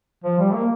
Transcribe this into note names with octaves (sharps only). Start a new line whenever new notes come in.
F3
G3
A#3